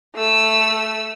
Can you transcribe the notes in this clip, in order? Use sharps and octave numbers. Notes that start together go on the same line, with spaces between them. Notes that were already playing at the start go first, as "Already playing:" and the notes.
A3 E6